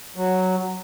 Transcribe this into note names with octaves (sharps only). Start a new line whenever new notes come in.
F#3